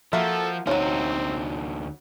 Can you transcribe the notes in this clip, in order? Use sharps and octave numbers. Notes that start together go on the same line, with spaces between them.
F3 A#3 F#4 A4 E5
D2 F3 F#3 C4 D#4 C#5